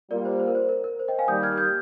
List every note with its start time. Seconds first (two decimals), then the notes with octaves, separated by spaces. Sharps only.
0.11 G3 A#3 F4 A#4 D5
0.25 C5
0.40 C5
0.48 A#4
0.55 C5
0.69 A#4
0.84 A#4
0.99 C5
1.08 D#5 G5
1.19 F5 G#5
1.28 D#3 G3 A#3 D#6 G6
1.43 F6 G#6
1.58 D#6 G6